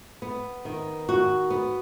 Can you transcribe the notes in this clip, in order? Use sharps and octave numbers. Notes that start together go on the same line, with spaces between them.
B3
D#3
F#4
B3